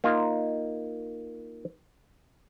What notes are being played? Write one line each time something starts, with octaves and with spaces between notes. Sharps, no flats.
A#3 D#4 F4